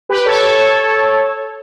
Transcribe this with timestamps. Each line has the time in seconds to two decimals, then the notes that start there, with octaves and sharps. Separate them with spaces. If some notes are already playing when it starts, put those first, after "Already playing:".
0.09 G4 B4
0.26 A4 C#5